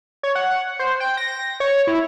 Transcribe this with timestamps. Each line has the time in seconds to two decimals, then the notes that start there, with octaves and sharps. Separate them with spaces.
0.23 C#5
0.35 F#5
0.79 C5
1.00 G5
1.17 A#6
1.60 C#5
1.87 E4